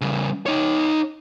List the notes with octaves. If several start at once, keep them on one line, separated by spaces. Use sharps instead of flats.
C#3 G3
D#4 C#5